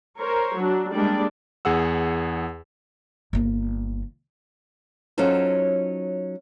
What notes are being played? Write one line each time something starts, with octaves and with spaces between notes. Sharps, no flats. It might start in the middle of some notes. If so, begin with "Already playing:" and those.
A#4 C5 C#5
F#3 D4
G3 G#3 A#3 D4 D5
E2 G#4 F#5 E6
G1 A#3
F#3 C#4 D#4 F4 A4 C5